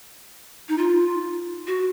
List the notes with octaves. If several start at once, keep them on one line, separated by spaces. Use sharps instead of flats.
D#4
F4
F#4